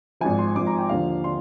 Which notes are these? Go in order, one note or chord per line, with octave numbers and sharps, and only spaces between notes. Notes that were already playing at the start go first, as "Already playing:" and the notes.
G#1 G#2 F3 G#5
C6
G#1 G#2 F3 D6
A#5
G5
D#2 D3 F3 F5
D3 C6